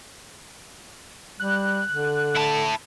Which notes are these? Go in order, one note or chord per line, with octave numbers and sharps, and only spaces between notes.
G3 F#6
D3
E4 A5